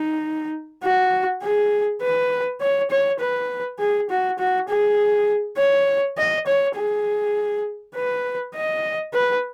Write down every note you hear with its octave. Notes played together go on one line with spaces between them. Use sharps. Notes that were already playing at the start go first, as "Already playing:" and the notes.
Already playing: D#4
F#4
G#4
B4
C#5
C#5
B4
G#4
F#4
F#4
G#4
C#5
D#5
C#5
G#4
B4
D#5
B4